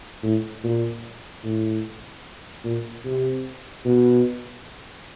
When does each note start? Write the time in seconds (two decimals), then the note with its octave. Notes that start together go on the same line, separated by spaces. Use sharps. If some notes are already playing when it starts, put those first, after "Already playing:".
0.23 A2
0.64 A#2
1.44 A2
2.64 A#2
3.05 C3
3.85 B2